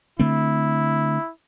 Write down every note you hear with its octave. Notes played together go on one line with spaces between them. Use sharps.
D3 A3 C4 E4